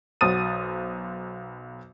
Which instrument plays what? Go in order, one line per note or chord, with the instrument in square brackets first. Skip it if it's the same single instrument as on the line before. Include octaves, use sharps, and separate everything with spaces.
[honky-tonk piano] B1 F#4 C5 D#6 A6 D#7